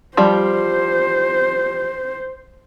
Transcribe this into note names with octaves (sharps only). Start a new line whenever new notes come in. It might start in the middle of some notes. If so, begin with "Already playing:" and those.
F3 G3 C5